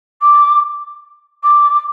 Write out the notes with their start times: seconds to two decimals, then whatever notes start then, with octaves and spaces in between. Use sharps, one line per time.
0.21 D6
1.43 D6